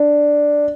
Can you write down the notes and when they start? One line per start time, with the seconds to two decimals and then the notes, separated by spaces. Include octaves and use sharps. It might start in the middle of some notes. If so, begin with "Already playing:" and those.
Already playing: D4